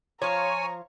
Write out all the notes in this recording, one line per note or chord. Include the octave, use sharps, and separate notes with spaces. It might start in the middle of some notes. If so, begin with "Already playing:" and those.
F3 C#5 F5 G#5 A#5